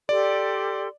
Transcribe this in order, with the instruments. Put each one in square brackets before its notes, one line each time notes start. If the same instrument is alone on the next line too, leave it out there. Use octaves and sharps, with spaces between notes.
[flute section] G4 A4 C6 [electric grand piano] D5